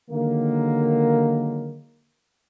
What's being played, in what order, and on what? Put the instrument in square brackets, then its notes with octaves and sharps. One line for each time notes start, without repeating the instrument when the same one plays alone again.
[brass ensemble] D3 D#3 F#3 G#3 A#3